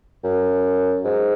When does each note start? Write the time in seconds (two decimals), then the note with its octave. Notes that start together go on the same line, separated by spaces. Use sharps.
0.24 F#2
1.05 G#2